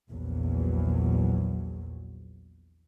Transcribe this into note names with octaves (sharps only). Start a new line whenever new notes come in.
A#1 E2 F#3